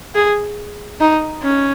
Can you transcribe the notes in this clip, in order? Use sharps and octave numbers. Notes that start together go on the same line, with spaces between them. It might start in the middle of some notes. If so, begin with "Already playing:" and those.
G#4
D#4
C#4